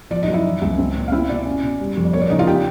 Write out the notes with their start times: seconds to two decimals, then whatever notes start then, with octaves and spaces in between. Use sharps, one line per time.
0.10 F3 D5
0.23 D#4 D#5
0.27 F#2
0.33 E4 E5
0.45 E3
0.62 C#2
0.78 C4
0.95 A#2
1.08 F5
1.12 C4 E4 E5
1.29 B2 D5
1.46 C#4
1.63 B2
1.80 G3
1.97 F2
2.05 D5
2.13 A#3 C#5
2.22 D5
2.30 C#3 D#4 D#5
2.39 F4 F5
2.47 B3 G4 G5